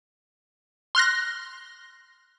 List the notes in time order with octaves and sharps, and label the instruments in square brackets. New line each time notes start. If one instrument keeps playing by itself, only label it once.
[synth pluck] C6 F6 F#6 A#6